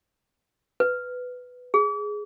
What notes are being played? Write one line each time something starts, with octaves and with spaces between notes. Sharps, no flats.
B4
G#4